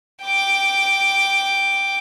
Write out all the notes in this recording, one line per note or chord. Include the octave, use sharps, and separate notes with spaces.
G5 D6